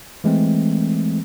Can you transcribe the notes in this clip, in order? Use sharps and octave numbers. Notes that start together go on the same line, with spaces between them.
E3 G#3 A3 C4